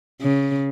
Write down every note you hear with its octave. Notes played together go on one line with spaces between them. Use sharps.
C#3